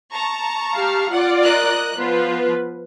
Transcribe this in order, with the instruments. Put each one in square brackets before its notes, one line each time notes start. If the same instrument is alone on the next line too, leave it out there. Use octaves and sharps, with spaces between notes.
[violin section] A5 A#5 C#6
[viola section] G4 F5
[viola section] F4 D5 [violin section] F#5
[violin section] A#4 D#5 F#6
[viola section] F3 B4 [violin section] B3 F4